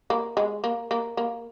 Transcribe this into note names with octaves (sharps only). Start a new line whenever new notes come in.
A#3
G#3
A#3
A#3
A#3